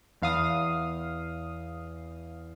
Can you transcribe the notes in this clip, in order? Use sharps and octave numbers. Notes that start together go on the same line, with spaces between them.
E2 F5 D#6